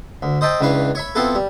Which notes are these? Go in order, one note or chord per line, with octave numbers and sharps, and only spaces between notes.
D2
C5 D#5 E5 G5 A5
C#2 E3 D4 B4 F5
C#5 E5 B5
B3 C4 E4 F4 A4 B4
G3